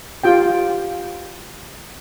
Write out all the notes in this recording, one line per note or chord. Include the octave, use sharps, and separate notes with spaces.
F4 G4 G5